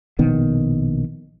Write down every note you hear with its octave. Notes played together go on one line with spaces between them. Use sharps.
A#1 B2 D#3 B3